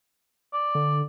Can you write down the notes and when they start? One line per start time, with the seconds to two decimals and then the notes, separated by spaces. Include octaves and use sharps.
0.53 D5
0.75 D3